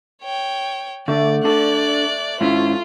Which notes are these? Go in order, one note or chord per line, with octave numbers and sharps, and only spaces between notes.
C#5 G5
D3 A3 D5
D4 A4 D5 F#6
G#2 C#4 E4 F4